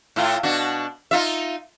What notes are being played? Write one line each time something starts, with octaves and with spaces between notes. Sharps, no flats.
A2 E4 F4
B2 D4 F#4
D#4 F4 E5